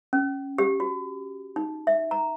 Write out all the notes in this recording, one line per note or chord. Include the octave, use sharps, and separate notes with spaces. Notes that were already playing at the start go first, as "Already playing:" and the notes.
C#4
G4
F#4
D#4
E5
A#5